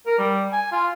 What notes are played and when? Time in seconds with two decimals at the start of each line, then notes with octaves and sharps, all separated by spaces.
0.07 A#4
0.18 G3
0.52 G#5
0.72 F4